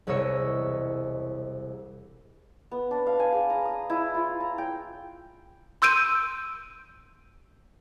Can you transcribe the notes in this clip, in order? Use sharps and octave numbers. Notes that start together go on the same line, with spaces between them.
E1 C2 C#5 D#5 E6 C#7
B3
D4
F5
G#5
G#4
A#5
D#6
E4
F4
A#5
G5
C6 E6 G6 D7 D#7